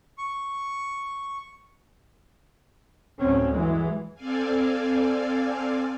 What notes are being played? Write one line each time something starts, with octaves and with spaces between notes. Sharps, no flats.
C#6
D2 A2 F#3 C4 C#4
G2 E3 F#3 G#3
C4 A4 D5 F5 G#5